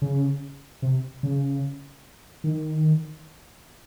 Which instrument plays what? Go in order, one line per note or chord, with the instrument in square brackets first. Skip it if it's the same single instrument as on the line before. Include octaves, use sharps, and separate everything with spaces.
[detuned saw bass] C#3
C3
C#3
D#3